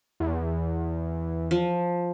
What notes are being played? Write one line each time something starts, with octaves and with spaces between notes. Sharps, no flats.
E2
F3